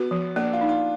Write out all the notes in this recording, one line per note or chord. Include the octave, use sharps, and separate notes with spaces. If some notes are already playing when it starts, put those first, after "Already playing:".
Already playing: B3 F#4
F3
A#3 D4
F4
D#4
F4